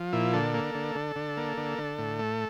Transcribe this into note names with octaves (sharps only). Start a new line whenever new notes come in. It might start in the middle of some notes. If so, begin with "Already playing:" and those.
Already playing: F3
A#2 E4
D3 A4
A#3
D3
D3
D3
A#3
D3
D3
A2
A3